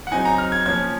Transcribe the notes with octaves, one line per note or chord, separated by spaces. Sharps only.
F#5
C#3 F#3 C4 D#4 G#5
A#5
F6
G#6
F3 A#3 C#4 G#6